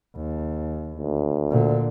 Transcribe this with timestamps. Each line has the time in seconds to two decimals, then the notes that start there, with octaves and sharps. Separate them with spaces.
0.16 D#2
0.96 D2
1.51 A#2 D3